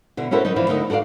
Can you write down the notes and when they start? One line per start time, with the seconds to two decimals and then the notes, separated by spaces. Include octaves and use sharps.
0.17 B2 D3 E4
0.31 C#4 E4 F#4 A4 A#4 C5
0.45 F#3 D#4
0.56 E3 F3 D4 E4
0.68 D2 D3 A3 D#4 A#4 D#5
0.90 F#4 A4 A#4 D5 F5